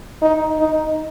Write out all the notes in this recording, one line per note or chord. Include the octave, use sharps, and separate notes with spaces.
D#4
D#4